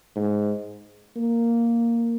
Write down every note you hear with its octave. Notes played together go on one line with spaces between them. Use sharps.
G#2
A#3